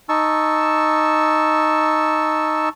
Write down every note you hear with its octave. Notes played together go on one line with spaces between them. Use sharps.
D#4 A5 C#6 E6